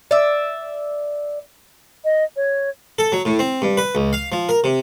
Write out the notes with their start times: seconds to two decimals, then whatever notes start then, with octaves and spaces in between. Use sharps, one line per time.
0.11 D5 E5
2.05 D#5
2.36 C#5
2.99 A4
3.12 F#3
3.25 A2
3.39 C4
3.62 G2
3.77 B4
3.95 C#2
4.13 F5
4.32 F3
4.49 A#4
4.64 C3